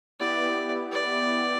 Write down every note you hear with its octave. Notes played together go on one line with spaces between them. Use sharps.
B3 E4 G4 D5
D5